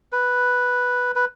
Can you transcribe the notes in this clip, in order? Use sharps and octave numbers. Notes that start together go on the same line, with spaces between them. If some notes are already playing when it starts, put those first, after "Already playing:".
B4
B4